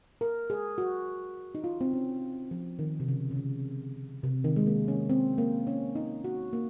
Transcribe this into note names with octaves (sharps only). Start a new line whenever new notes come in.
A#4
G#4
F#4
D#4
F4
C4
C#4
F3
D#3
C3
C#3
C#3
C3
C3
D#3
G#3
A#3
C#4
C4
A#3
C#4
D#4
F#4
A#3